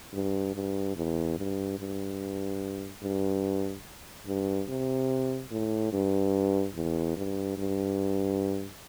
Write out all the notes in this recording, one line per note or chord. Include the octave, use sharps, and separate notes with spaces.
G2
G2
E2
G2
G2
G2
G2
C3
A2
G2
E2
G2
G2